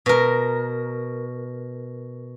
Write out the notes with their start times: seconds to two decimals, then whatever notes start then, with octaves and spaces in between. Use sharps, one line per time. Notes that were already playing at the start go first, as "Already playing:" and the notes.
0.06 B2 A#4